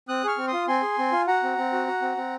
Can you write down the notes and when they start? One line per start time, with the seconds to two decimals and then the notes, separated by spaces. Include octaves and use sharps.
0.08 C4 D#6 F#6
0.24 G#4 C#6 F6
0.38 C4
0.47 C6 D#6
0.53 F4
0.67 C4 G#5 C6
0.82 G#4
0.98 C4
1.12 F4
1.27 F#4 F#5 A#5
1.43 C4
1.58 C4
1.73 F#4
1.88 F#4
2.02 C4
2.17 C4